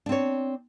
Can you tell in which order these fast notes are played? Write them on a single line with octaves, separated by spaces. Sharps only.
D4 C4 C#5